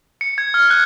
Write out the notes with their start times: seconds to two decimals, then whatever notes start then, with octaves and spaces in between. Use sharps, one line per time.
0.21 C#7
0.38 G#6
0.54 F6
0.70 F#6